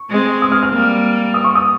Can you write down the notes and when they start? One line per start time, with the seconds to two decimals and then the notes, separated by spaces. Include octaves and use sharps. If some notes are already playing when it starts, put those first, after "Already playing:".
Already playing: C#6
0.11 G#3 C4
0.42 D#6
0.52 F6
0.63 F6
0.73 G3 A#3
1.34 D#6
1.44 C#6
1.55 D#6